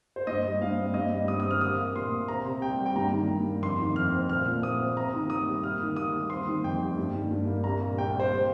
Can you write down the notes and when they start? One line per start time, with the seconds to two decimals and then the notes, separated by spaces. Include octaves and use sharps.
0.16 C5
0.27 G2 D#5
0.45 G3
0.61 G2 F5
0.78 C4
0.94 G2 D#5
1.11 G3
1.27 G2 D#6
1.40 D#6
1.45 C4
1.51 F6
1.61 A#3 D#6
1.78 A#3
1.95 A#2 C6
2.11 A#2
2.28 C4 A#5
2.45 C3
2.61 C2 G5
2.79 G3
2.86 G5
2.96 G2 A#5
3.13 D#3
3.29 G2
3.45 A#3
3.62 F2 C6
3.80 D#3
3.95 F2 F6
4.13 C4
4.29 A#2 F6
4.46 F3
4.63 A#2 D#6
4.80 C4
4.97 C4 A#5
5.13 D#3
5.30 D#2 D#6
5.47 G3
5.63 A#3 F6
5.81 D#3
5.96 D#2 D#6
6.13 G3
6.30 C4 C6
6.46 D#3
6.64 F2 G5
6.81 G3
6.97 G2
7.14 D#3
7.31 G2
7.47 A#3
7.64 C2 A#5
7.81 A#2
7.98 C2 G5
8.14 A#3
8.20 C5
8.31 A#3